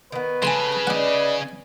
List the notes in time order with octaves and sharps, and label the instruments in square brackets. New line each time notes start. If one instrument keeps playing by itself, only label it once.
[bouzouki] D#3 B3 [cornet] B4
[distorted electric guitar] C#3 [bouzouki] A4 [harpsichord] G#5 B5 C6
[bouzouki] D#4 D5 [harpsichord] F#5 D6